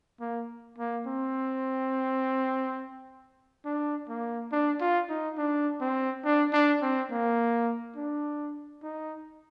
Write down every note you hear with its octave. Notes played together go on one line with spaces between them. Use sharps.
A#3
A#3
C4
D4
A#3
D4
F4
D#4
D4
C4
D4
D4
C4
A#3
D4
D#4